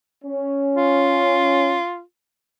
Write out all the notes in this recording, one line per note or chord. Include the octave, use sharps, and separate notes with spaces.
C#4
F4